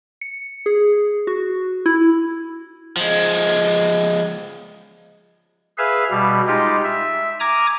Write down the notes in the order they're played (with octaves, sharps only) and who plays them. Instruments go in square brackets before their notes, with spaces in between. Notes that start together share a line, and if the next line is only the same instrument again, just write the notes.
[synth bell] C#7
G#4
F#4
E4
[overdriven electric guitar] F3 G#3
[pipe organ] G#4 B4 E5 F5
B2 G3
G#3 D#4 F4 G4
E5
G#5 A#5 D6 D#6 F6 G#6